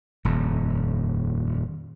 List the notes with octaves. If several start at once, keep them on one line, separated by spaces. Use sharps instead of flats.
D#1 F2